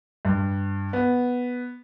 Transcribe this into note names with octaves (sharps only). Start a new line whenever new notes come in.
G2
B3